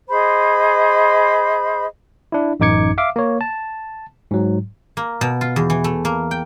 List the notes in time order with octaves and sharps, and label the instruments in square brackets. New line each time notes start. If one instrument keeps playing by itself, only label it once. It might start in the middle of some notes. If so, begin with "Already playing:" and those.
[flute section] G#4 C5 D#5 B5
[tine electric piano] D4 E4
A1 F#2 D#4 D6 G#6 C#7
E5 F5 D6
A#3 C#5
A5
G#2 F#3
[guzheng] A#3
B2
F4
E2
E3
A3
A#3
G5